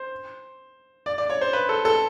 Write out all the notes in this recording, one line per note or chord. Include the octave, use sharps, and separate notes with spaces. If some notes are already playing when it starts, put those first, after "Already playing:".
Already playing: C5
D5
D5
C#5
C5
B4
A4
A4